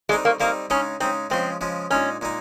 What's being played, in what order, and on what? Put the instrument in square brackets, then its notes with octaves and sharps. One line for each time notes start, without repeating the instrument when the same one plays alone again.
[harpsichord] G3 [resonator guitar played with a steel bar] G#3
[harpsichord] C4 D#4
[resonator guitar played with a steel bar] A#3
[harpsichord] G3 C4 D#4 [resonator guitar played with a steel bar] A#3
[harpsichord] C#3 G#3 D#4 [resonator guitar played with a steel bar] C#4
[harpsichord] C#3 G#3 D#4 [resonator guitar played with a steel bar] C4
[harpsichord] C#3 F3 G#3 [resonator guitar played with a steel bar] C4
[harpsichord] C#3 F3 G#3
[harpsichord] A#2 G#3 D#4 [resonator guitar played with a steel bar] C#4
[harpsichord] A#2 G#3 D#4